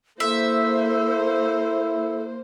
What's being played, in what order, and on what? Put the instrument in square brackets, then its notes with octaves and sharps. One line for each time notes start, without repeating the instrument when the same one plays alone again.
[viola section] A#3 C5 [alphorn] E4 [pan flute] A4 [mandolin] E5